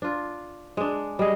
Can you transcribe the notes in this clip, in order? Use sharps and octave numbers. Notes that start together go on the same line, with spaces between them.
D4 F4
G#3 D4
G3 G#4 D#5